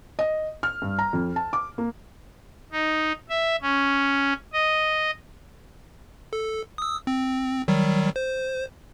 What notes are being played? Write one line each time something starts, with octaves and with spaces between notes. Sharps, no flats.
D#5
F6
G2
A#5
F2
A5
D6
A#3
D#4
E5
C#4
D#5
A4
D#6 E6
C4
D#3 F#3 G3
C5